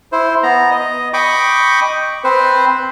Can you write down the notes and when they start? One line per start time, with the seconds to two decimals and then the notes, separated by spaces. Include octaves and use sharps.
0.12 E4 C5
0.43 B3 A#5
0.71 D#5
1.13 D#5 G5 B5 C#6 D6
2.24 C4 B4 C5